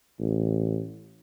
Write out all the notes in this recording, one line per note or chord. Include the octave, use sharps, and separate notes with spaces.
A1